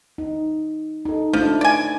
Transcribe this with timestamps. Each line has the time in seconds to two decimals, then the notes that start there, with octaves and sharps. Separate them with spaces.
0.18 D#4
1.05 D#4 A4
1.33 F3 A3 D4 E4
1.61 D5 G#5